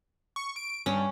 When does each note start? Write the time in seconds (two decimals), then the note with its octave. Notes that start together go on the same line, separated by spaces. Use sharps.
0.36 C#6
0.56 D7
0.86 G2 C#4